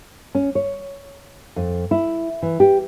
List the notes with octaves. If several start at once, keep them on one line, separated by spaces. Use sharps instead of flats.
C#4
C#5
F2
E4
E3
G4